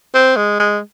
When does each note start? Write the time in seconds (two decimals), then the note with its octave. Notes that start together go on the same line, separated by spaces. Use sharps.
0.14 C4
0.36 G#3
0.60 G#3